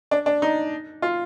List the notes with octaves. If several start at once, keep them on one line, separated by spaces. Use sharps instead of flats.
D4
D4
D#4
F4